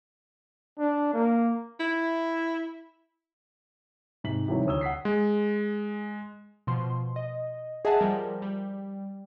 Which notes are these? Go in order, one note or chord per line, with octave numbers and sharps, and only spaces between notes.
D4
A#3
E4
G#2 C3 B6 F#7
C3 D#3 E3 F#3 G3
D2 C#5 D#6 E6 G7
F#5 E6 B6 C7
G#3
B2 F3 C6
D#5
G#4 D#5 E5 F#5 A5
F3 G3 A#4
G3